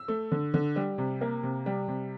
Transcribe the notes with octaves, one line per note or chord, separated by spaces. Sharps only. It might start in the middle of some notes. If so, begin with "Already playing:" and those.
Already playing: E6
A3
D3
D3
G3
C3
A#3
C3
G3
C3